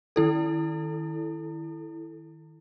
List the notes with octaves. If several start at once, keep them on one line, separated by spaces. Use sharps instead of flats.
D#3 E4 A4